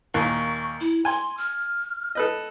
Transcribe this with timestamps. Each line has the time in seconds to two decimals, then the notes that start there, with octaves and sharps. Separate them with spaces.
0.14 D#2 A#2 C#6
0.80 E4
1.05 G#5 C6
1.37 F6
2.15 A4 B4 D#5